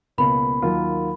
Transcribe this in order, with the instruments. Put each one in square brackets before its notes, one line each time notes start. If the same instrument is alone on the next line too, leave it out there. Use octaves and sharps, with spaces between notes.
[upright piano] C#2 B2 A#3 C#4 [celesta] B5
[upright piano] D#2 D#3 F#3 A#3 F4